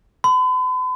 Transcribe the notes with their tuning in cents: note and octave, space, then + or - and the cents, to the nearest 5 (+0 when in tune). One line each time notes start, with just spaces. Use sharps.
B5 +45